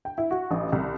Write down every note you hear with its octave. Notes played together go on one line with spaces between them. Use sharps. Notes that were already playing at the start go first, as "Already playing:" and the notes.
G5
E4
F#4
A1
C2